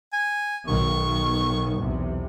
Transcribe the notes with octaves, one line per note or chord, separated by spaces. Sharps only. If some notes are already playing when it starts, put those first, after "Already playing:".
G#5
B1 B2 D#3 C#6
B1 E2 C3